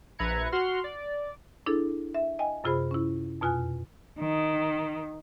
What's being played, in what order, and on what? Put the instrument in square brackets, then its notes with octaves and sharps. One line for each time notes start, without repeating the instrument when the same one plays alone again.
[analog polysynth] A#1 B4 E5 A#5 G#6 C#7
F#4 F#5 C6 F6
D5
[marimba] D4 E4 G#4 A4
E5
D#5 G5 G#5
F#2 C3 F4 G#4 C5 B5
C#4 E4
F2 B2 F4 G#5 F#6
[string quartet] D#3